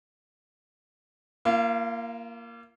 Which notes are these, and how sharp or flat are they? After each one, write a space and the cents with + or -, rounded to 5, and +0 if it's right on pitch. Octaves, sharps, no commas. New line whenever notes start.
A#3 +0 F4 -40